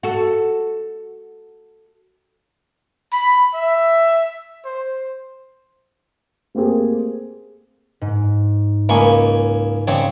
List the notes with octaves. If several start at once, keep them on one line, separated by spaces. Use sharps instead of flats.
F#4 A4
B5
E5
C5
A3 A#3 C4 G4 G#4
G#2
C#2 A#3 G#5 B5 C#6
C#3 G3 C4 C#5